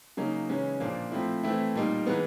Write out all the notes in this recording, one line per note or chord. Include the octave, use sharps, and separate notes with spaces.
C#3 F#3 A#3 D#4
C#3 E3 G#3 C#4
A#2 F3 A#3 D4
F3 A3 C4 E4
E3 A3 C4 E4
A#2 G3 A#3 D#4
E3 G#3 B3